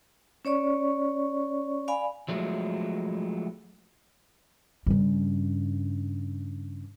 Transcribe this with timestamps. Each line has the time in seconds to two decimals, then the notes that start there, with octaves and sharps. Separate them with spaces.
0.45 C#4 C#5 D5 C#6
1.88 D5 F5 G#5 B5
2.28 F3 F#3 G#3 A3
4.86 G2 C#3